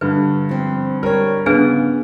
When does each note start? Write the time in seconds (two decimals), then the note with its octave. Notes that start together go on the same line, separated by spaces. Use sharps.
0.01 G2 D3 B4
0.49 F3 C4
1.03 G3 A#4 C#5
1.46 C#3 B3 D4 G#4 B4